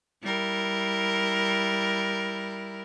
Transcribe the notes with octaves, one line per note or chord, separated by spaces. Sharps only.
G3 E4 A#4